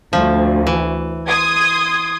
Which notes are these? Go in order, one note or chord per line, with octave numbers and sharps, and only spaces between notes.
D2 F3
E3
C6 D#6 G#6